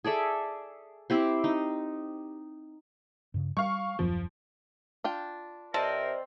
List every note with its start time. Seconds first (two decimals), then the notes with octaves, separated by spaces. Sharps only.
0.04 G#4 A4 D5 E5
1.10 C4 E4 G4 C5
1.44 D#4
3.34 G2 C#3
3.57 G3 F5 C#6
3.99 D#1 F#2 F3 F#3
5.04 D4 F4 G5
5.74 C3 C4 A#4 C5 D5 D#5 A5